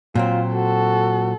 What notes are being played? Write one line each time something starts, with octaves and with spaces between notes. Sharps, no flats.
A#2 F#3 C4 F4
F#4 A4